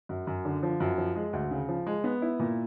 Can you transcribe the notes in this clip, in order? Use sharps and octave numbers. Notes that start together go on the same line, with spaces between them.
F#2
F#2
D3
F3
F#2
F3
G#3
D2
C#3
F3
G#3
B3
E4
A#2